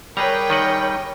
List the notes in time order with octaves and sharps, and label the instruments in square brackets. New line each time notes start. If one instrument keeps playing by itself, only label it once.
[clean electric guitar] G3 G#4 B4 [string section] A#4 C#5 G5 [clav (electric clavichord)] A#5
[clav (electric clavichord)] D#3 D#5 F#5